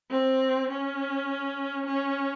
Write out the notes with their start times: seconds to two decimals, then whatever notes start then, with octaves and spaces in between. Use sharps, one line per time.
0.11 C4
0.70 C#4
1.86 C#4